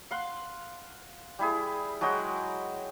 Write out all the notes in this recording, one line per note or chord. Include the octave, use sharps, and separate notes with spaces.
F5 F#5 C6
G3 E4 G#4
F#3 G#3 F#4 G5